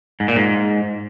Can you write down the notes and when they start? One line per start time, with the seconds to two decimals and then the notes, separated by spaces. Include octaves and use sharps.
0.20 G#2
0.28 A#2
0.36 G#2